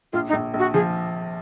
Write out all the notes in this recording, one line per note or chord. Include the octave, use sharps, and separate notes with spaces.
A#1 F4
D#4
A#1
A#1 F#4
F3 G#4